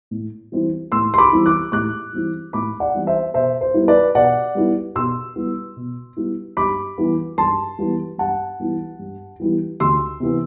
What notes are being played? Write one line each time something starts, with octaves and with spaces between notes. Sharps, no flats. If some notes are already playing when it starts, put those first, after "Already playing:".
A2
E3 G3 C4 E4
A2 C6 E6
C6
B5 D6
E3 G3 C4 E4
D6 F#6
A2 D6 F#6
E3 G3 C4 E4
A2 B5 D6
D5 F#5
E3 G3 C4 E4
C5 E5
B2 C5 E5
C5
G3 B3 E4
B4 D5
B2 D5 F#5
G3 B3 E4
B2 C6 E6
G3 B3 E4
B2
G3 B3 E4
G2 B5 D6
E3 G3 B3 E4
G2 A5 C6
E3 G3 B3 E4
G2 F#5 A5
E3 G3 B3 E4
G2
E3 G3 B3 E4
D2 C6 E6
C3 E3 B3